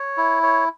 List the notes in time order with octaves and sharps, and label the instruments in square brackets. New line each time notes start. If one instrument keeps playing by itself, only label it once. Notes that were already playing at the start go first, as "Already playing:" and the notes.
Already playing: [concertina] C#5
E4
C#5